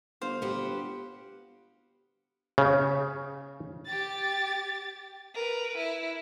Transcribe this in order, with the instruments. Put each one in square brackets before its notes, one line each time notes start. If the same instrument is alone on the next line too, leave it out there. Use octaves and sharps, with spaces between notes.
[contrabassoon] G1 [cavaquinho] C5 F5
[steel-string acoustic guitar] B3 F#4 G4
[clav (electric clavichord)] C#3
[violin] G4 A6
A#4 B4
E4